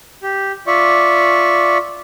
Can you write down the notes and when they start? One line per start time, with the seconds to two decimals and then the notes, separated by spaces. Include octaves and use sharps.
0.23 G4
0.67 F4 D5 E5 C#6